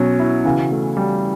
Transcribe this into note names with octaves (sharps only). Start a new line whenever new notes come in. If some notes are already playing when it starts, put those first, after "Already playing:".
Already playing: B2 F#3 C#4
E4
C#3 E3 F#4
A3
G3